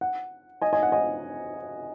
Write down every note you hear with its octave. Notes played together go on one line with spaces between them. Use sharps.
F#5
D#5 G#5
D#5 G#5
F#5
D#5 G#5